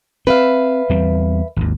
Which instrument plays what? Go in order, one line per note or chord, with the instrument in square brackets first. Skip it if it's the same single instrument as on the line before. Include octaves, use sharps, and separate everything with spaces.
[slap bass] C4 [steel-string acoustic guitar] B4 E5 F5
[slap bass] E2 G3 C4
G#1 D#2